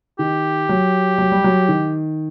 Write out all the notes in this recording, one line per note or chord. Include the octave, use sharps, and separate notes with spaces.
D#3 G4
F#3
F#3
G3
F#3
D#3